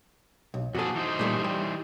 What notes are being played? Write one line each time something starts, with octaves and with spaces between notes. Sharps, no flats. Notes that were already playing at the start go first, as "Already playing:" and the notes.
B1
F2 A#2 F#4 G#4 A4
E3 D#4 C5
A#2 G3 A3
G3